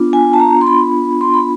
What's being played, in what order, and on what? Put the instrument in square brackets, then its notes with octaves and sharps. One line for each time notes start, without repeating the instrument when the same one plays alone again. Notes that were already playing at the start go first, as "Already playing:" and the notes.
Already playing: [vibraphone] B3 D4 F4
G#5
A5
A#5
C6
B5
C6
B5